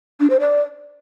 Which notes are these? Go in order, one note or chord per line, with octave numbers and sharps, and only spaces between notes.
D4
C5
D5